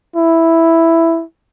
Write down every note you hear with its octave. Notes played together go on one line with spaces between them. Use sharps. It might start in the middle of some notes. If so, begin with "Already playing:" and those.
E4